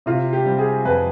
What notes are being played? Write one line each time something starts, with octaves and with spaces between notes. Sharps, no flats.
C3 F4
G4
G3 C4
G#4
F2 B4